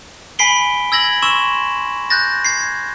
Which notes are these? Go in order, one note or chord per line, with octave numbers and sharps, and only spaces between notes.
G#5 B5 B6 C7 D7 G7
E6 G#6 A#6 F#7
C6 C#6 E6 E7
F#6 G6 A6 A#6
G#6 C7